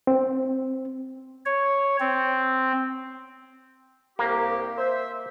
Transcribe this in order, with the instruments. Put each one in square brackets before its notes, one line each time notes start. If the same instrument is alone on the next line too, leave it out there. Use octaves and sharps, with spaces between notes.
[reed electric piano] C4
[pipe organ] C#5
C4
[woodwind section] C2 G4 [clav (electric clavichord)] A#3
[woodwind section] C5 E5